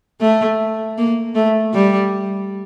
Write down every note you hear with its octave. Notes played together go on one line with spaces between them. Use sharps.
A3
A#3
A3
G3